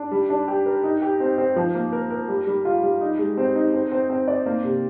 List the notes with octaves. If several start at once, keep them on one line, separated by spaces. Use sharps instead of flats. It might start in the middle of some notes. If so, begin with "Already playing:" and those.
Already playing: D4
G3
D4
G4
A#4
D#4
G4
C4
C4
F3
A#3
A#4
A#4
G3
G3
F4
G3
D#4
G#3
C4
D#4
C4
C4
C4
D5
A#3
C3